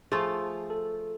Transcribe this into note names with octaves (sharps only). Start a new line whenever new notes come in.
F3 A3 F4 G#4
A4